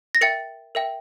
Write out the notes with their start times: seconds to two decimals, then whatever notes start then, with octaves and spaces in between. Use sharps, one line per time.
0.15 A#6
0.21 A#4 E5 G5 A6 C#7
0.75 A#4 E5 G5